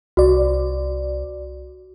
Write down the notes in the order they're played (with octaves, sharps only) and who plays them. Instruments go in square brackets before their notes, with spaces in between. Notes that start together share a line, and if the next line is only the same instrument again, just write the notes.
[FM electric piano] C2 D5 [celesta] F#4